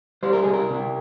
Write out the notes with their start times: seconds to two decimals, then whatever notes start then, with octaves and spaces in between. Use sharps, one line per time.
0.23 G3 C5
0.33 A#4
0.43 C2 G#4
0.53 A#4
0.70 C3